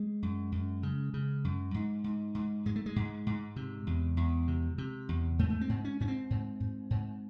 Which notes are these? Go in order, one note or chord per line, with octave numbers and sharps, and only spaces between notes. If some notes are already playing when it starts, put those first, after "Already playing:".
Already playing: G#3
F#2
F#2
C#3
C#3
F#2
G#2
G#2
G#2
G#2 G#3
A3
G#3
G#2
G#2
C3
E2
E2
C3
C3
E2
G#2 A3
A3
C4
G#2
C#4
G#2 C#4
C4
G#2
G#2
G#2